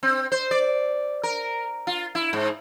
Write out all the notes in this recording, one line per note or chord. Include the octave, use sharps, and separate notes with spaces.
C4
C5
D5
A#4
F4
E4
G#2